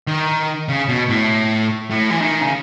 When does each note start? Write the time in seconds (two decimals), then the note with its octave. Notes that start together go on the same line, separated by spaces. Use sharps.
0.07 D#3
0.69 C#3
0.88 B2
1.09 A2
1.91 A2
2.11 E3
2.21 D#3
2.41 C#3